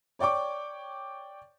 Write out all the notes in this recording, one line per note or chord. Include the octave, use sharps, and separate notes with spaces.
C#5 D5 G5 C#6 D6